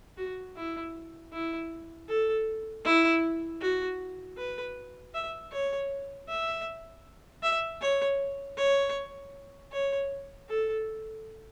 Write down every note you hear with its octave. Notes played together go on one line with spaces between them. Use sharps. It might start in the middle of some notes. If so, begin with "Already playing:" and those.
F#4
E4
E4
A4
E4
F#4
B4
E5
C#5
E5
E5
C#5
C#5
C#5
A4